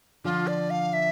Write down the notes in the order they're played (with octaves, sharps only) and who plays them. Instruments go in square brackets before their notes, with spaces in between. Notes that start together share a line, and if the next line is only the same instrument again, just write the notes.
[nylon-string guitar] D3 F3 [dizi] F4
[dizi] D5
F5
E5